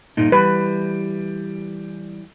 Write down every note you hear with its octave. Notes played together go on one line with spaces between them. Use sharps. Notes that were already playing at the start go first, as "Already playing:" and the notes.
G2 A#2 D#4
E3 G3 B4